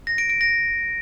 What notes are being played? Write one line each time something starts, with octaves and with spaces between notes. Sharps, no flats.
A#6
D7
D7
A#6